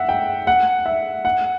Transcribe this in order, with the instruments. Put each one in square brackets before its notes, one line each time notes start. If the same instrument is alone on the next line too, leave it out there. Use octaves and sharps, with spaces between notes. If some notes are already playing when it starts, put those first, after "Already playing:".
Already playing: [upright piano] E5 F#5
G5
F#5
E5
F#5